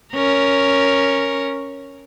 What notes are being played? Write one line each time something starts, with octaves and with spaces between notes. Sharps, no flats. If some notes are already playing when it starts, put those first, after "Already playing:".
C#4 A#4